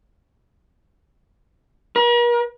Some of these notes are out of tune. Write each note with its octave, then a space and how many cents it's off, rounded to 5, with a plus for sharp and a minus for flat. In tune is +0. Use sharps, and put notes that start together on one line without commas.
A#4 +45